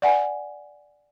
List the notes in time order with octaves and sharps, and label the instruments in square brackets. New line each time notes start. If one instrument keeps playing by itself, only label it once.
[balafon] D5 F#5 G#5